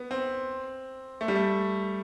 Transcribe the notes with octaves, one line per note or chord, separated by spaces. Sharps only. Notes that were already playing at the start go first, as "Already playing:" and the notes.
Already playing: B3
C4
A3
G3
A3